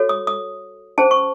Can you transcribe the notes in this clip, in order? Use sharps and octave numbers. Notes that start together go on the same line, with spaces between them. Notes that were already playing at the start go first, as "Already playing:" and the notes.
Already playing: F#4 A4 C#5
D#6
D#6
C#4 G#4 C5 A5
C#6